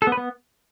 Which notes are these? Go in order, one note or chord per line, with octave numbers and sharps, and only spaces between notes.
A4
B3
B4
B3